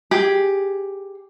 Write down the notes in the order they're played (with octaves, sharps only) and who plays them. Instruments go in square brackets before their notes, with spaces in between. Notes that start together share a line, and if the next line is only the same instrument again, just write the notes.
[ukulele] G4 G#4